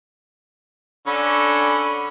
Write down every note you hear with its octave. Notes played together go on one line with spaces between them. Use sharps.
D3 C#4 B5